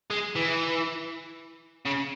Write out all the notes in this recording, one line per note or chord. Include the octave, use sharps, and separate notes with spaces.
G#3
E3
C#3